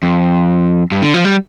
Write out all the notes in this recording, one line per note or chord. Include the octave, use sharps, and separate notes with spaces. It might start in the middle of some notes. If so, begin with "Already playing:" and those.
F2
G2
D3
F3
G3